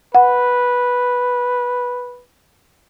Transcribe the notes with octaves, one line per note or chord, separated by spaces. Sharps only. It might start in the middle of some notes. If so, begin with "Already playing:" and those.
B4 F#5